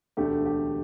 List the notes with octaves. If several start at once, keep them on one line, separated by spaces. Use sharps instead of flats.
E1 D2 D3 A3 G4
G4